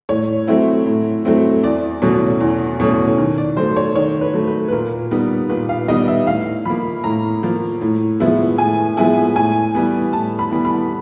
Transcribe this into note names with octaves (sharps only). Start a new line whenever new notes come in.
A2 C#5
F#3 A3 C4 E4
A2
F#3 A3 C4 E4
E2 D5
B2 F#3 A3 C#4
E2
B2 F#3 A3 C#4
D#3
D5
F#3 A3 C5
C#5
D#3 C#5
B4
F#3 A3
B4
B4
A#2 A#4
G3 B3 D#4
A#2 B4
F5
G3 B3 D#4 D#5
E5
A2 F5
F3 A#3 B5
A2 A#5
F3 A#3
A2
F3 G#3 B3 E4
A2 G#5
F3 G#3 B3 E4 G#5
A2 G#5
E3 G3 B3
A2 A5
B5
E3 G3 B3
B5